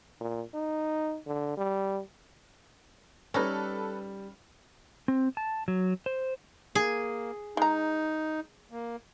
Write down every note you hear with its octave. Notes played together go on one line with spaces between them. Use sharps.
A#2
D#4
D3
G3
G3 C#4 D#4 A4 B4 D5 F6
C4
A5
F#3
C5
A#3 G#4
G#3 D#4 A#5
A#3